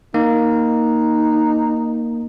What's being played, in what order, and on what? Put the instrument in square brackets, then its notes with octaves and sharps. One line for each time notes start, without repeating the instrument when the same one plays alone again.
[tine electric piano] A#3 [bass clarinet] D#4